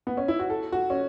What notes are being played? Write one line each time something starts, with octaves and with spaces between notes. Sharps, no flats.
B3
C#4
E4
F#4
A4
F#4
C#4